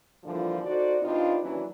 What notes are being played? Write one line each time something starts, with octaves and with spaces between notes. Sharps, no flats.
G2 A#2 D3 E3 F3
D#4 F#4 A4 C5 D5
C3 B3 D4 D#4 F4
D#2 E3 F#3 C#4 D4 B4